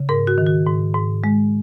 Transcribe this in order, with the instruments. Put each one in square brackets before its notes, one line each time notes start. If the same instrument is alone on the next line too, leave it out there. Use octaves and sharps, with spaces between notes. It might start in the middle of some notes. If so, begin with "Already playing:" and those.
Already playing: [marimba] C#3
G#2 A#4
F#4
D#3
F#4
G#2
G#2
G#3